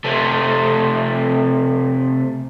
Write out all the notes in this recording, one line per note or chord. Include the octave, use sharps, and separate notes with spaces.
C3 A3